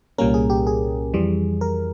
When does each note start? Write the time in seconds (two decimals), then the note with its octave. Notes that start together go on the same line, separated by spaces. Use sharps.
0.18 C2 A#2 G3 A#3 C#4 A#4
0.34 G#4
0.50 G4
0.67 G#4
1.14 F2 E3 G3
1.61 A#4